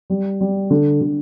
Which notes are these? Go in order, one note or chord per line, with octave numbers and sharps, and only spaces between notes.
G3
G3
D3
D3